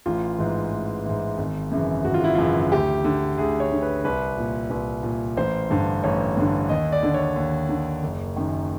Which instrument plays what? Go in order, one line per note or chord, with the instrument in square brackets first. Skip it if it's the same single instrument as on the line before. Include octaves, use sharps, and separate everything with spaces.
[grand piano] A1 F4
G#2 E3
A1
G#2 E3
G#1
F#2 C#3 E3
G#1 F#4
F4
E4
F#2 C#3 E3 F4
D2 G4
D3
D2 G#4
C#5
D3
B4
C2 B4
A#2
C2 B4
A#2
A1 C5
G2 D3
A1 C#5
G2 D3
D#2 D#5
D5
D3
C#5
D#2
D3
F#1
F#2 D#3